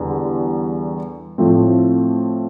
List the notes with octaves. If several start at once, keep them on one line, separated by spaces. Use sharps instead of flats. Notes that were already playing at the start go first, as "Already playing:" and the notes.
Already playing: E2 D3 G3
A2 F3 A3 C4